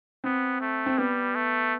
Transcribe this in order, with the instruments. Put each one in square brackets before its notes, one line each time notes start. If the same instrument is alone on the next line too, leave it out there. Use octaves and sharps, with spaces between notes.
[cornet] B3 [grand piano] C4
[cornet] A3
[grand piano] C4
[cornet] G3 [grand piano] B3
[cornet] A3